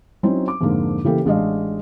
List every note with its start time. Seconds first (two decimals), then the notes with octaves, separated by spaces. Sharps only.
0.23 F#3 C4 C#4 D#4 E4
0.48 D6
0.61 F2 G#2 D3 A#3
1.04 C#3 E3 A#3 G4 A4
1.25 A1 G#3 D4 D#5 F5